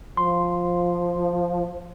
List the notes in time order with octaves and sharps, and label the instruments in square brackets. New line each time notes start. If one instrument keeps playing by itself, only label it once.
[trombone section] F3 [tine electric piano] C6